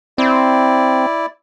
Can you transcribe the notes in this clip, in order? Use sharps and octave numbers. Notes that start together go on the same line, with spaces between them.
C4 E4 D5